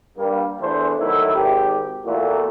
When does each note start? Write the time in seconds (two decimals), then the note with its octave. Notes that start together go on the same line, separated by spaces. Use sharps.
0.18 G2 G3 A#3
0.61 E2 E3 A3 D4 E4 C5
0.99 D#3 F#3 A3 E4
1.34 G#1 G4
2.06 E2 A#2 A3 A#3 E4 F#4